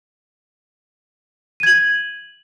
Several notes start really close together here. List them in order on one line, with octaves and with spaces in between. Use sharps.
D#7 G#6 F#7